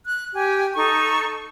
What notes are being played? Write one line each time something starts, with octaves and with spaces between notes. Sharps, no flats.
F#6
G4 G#5
D#4 A4 C#6